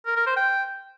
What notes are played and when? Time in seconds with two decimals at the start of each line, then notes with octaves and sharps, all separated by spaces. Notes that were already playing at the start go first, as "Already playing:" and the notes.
0.06 A#4
0.16 A#4
0.26 C5
0.37 G5